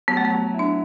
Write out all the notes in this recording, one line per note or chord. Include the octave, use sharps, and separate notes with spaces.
F#3 B3
A3
B3
F#3
E4
D4